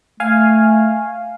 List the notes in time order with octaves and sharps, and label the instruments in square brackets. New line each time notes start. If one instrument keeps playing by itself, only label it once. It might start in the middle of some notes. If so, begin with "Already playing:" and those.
[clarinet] A3 [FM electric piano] F5 G#5